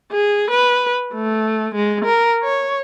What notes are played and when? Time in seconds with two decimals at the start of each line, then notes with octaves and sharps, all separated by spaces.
0.12 G#4
0.50 B4
1.14 A3
1.74 G#3
2.05 A#4
2.43 C#5